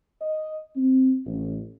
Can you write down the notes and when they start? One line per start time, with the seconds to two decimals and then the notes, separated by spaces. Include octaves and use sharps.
0.21 D#5
0.76 C4
1.26 A1